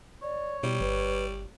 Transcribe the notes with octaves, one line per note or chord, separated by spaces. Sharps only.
C#5 D5
B2 G3 E4
G1 B4